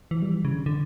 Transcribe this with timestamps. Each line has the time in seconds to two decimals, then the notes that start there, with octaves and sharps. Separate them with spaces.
0.11 E3
0.22 G3
0.34 E3
0.45 C#3
0.55 D3
0.66 D3